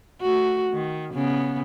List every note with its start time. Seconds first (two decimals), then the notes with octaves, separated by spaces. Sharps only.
0.21 A3 F#4
0.73 D#3
1.14 C#3 B3